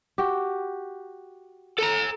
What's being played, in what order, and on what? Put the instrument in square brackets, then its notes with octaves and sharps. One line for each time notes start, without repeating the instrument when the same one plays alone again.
[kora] F#4 G4
[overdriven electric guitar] A4 A#5